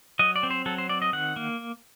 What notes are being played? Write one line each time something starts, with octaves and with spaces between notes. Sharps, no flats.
F#3 D#5
D5
C4
C5
F#3 A4
C5
C4 D5
D#5
D#3 F#5
A#3